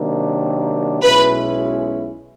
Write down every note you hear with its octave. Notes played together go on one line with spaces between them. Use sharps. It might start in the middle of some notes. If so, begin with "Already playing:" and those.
Already playing: C3 D#3 F#3 A#3 D4
B1 B2 G#3 C#4 E4 B4